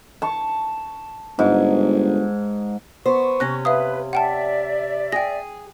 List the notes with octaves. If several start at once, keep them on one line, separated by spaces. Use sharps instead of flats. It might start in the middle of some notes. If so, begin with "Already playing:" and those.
A5 C#6
G1 G#2
B3 C5 C#6
C3 C#4 F#6 A#6
B4 E5 F5 D#6
D5 E5 F#5 G5 A5
G#4 G5 A#6